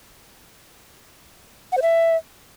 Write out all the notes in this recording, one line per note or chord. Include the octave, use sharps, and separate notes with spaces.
F#5
C5
E5